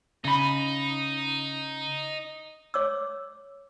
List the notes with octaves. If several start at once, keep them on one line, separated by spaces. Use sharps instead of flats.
C#3 D#4 B5
C#5 D6 E6